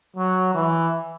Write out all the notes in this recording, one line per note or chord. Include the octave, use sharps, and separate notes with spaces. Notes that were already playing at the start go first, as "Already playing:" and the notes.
F#3
E3